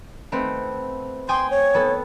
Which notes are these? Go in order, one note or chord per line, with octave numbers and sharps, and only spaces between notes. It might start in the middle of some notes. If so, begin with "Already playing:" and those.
A3 B3 C4
G5 G#5 C6 D#6
C#5
B3 A4